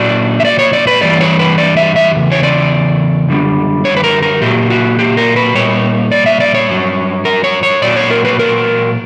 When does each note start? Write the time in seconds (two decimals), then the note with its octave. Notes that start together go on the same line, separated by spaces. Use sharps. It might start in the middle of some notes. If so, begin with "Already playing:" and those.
Already playing: A#2 F#3 D5
0.40 E5
0.45 D5
0.59 C#5
0.73 D5
0.87 B4
1.01 G2 E3 G3 D5
1.21 C#5
1.39 B4
1.58 D5
1.77 E5
1.96 E5
2.15 E2 C#3
2.32 C#5
2.43 D5
3.29 F#2 D3 G3
3.85 C#5
3.97 B4
4.04 A#4
4.23 A#4
4.41 A#2 F#3 G4
4.70 F#4
4.99 G4
5.17 A#4
5.36 B4
5.55 A#2 G3 C#5
6.12 D5
6.26 E5
6.40 D5
6.55 C#5
6.68 G2 F#3
7.25 A#4
7.44 C#5
7.63 C#5
7.82 A#2 F#3 D5
7.96 C#5
8.11 A#4
8.25 B4
8.39 A#4